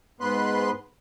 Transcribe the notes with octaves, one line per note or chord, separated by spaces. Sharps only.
G#2 B3 B4 C6 F#6